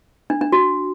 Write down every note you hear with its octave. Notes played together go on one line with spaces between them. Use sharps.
D4
D4
F#4